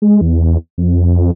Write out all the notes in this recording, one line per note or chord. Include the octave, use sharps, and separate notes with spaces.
G#3
E2
F2